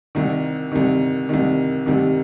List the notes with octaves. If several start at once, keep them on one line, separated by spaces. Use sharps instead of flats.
C2 C3 D#3
C2 C3 D#3
C2 C3 D#3
C2 C3 D#3